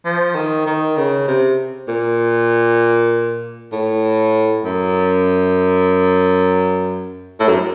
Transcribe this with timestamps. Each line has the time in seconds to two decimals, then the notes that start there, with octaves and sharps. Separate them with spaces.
0.05 F3
0.36 D#3
0.66 D#3
0.97 C#3
1.28 C3
1.88 A#2
3.72 A2
4.65 F#2
7.40 A2
7.49 F#2